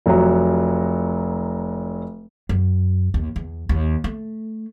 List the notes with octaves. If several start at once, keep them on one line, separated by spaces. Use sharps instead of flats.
F1 F#3 A#5
F#2
D#2
E2
D#2
A3